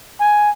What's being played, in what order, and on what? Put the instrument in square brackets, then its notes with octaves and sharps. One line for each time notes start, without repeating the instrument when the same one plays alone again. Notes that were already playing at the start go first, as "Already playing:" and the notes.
[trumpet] G#5